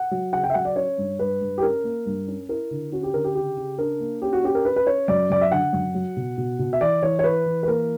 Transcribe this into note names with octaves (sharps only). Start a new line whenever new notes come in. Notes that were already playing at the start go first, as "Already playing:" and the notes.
Already playing: F#5
F#3
C#3 F#5
G5
E5
F#3 F#5
D5
C#4 C#5
G2
G2 B4
G2
G4
C#4 A#4
A#3
G2
C#4
E4 A#4
D3
C#4 F#4
G4
D3 A#4
G4
C#3 G4
C#3
D4 A#4
A#3
C#4 G4
F#4
C#4 G4
A#4
C#4 B4
B4
C#4 C#5
F#2 D5
F#2 D5
E5
D3 F#5
F#2
F#3
B2
B2
B2
E5
E3 D5
E3 C#5
C#5
E4 B4
E3
B4
A#3 A#4